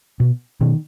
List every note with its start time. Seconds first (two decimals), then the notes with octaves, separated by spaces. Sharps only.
0.20 B2
0.61 B2 D#3